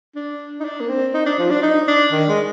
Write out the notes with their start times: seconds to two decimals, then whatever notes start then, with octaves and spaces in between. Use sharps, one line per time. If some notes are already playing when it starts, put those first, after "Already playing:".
0.15 D4
0.60 D#4
0.65 D4
0.80 A#3
0.89 C4
1.14 D#4
1.26 D4
1.39 F3
1.50 D4
1.63 D#4
1.88 D4
2.12 D#3
2.29 G#3